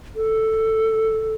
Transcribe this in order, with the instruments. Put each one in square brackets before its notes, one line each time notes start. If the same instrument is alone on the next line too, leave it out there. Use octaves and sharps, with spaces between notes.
[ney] A4